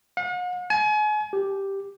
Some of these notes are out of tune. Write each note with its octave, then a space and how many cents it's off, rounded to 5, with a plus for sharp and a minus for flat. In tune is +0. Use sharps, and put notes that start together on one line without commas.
F#5 -45
G#5 +35
G4 +0